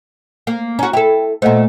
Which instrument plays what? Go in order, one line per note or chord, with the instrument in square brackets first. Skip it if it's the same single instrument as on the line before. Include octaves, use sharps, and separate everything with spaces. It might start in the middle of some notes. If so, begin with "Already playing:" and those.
[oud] A#3
[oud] C#4 F#4 [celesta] A#5
[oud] E4 A4 [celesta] G5
[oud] A#2 A3 [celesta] C5 D#5 F#5